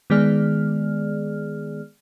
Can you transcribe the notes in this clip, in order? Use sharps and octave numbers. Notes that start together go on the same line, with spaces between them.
D#3 G#3 B3 G#4 D5 F6